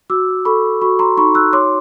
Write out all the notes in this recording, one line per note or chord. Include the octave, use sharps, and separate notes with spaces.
F#4 D6 E6
A4 B5 C#6
F#4 B5 C#6
A#5 C6
D#4 B5 C#6
E6 F#6
C#5 C6 D6